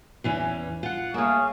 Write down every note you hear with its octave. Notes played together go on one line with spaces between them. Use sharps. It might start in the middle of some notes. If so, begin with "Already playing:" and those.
E2 E3 C#4
F4 F#5
A3 A#3 G#4 C#5 F5